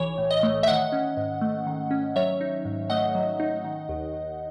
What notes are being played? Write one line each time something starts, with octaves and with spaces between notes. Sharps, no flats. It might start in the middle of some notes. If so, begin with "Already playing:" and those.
Already playing: B1 E3 C#5
A2
D#5
A3
E5
D#3 D#5 F#5
C#4
G#2
A3
D#3
C#4
F#3 C#5 E5
D#4
G#2
A3 D#5 F#5
F#3
D#4
D#3
D#2
D#2